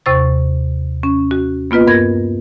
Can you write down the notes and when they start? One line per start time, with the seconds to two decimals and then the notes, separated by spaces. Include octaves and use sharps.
0.06 D#2 C3 C5 C#6 A6
1.03 C#4
1.31 F#4
1.71 A#3 B3 F4 B4 D#5
1.87 G2 A#4 G#6 A#6